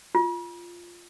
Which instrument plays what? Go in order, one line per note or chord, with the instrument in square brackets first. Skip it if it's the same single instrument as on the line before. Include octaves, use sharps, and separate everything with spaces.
[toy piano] F4